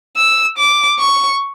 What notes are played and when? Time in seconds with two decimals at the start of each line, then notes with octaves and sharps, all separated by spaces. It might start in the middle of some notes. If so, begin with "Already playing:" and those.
0.17 E6
0.58 D6
0.99 C#6